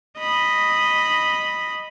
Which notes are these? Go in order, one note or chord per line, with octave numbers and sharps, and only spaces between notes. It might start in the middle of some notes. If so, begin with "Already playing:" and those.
D#5 B5